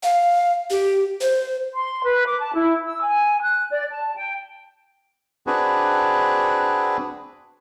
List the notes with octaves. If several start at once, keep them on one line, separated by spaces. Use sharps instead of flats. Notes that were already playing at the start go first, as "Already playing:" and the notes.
F5
G4
C5
C6
B4
D6
A5
E4
E6
G#5
F#6
D5
A5
G5
C4 D4 F#4 G#4 B4